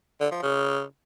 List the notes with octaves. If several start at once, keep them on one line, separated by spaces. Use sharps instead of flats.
D3
F3
C#3